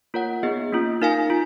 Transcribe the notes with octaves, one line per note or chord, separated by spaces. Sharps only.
A#3 F4 A#4 C#5 F#5
B3 D#4 G#4 D#5
A#3 C#4 F4
D#4 A#4 F5 G#5
F4